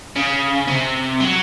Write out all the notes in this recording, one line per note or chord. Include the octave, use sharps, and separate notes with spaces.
C#3
C3
F#3